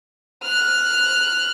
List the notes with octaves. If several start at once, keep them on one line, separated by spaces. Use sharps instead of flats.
F6 F#6